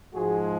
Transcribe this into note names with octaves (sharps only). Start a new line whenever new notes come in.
G#2 F3 G#3 F#4 G#4